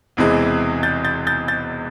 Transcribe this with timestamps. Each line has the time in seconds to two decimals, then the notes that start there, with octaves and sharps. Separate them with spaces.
0.17 E1 E2 C3 E3 G#3
0.83 G6 A6
1.05 G6 A6
1.27 G6 A6
1.48 G6 A6